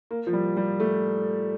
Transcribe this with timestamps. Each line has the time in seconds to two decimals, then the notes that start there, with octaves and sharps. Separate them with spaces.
0.11 A#3
0.27 F3
0.33 G3
0.57 G3
0.80 A3